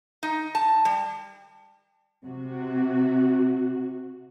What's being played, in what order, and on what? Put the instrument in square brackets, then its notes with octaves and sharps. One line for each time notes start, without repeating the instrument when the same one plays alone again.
[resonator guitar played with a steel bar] D#4
A5
G3
[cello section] C3 F#4